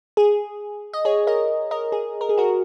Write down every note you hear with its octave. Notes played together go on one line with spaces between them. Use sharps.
G#4
D#5
G#4 C#5
A#4 D#5
A#4 D#5
G#4
A#4
G#4
F#4 A#4